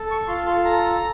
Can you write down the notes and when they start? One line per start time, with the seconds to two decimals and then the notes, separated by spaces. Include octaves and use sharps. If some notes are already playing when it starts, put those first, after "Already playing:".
Already playing: A4
0.10 C#6
0.28 F4 C6
0.47 C6
0.65 A4 A#5